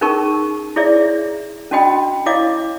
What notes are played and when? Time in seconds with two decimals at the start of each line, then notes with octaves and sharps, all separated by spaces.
0.01 C#4 D#4 G#4 A#4 A5 C#6
0.76 E4 G#4 C#5 D5 E5
1.01 E5
1.71 C#4 D4 F#4 D#5 G5 B5
2.26 E4 C#5 D#5 F5 D6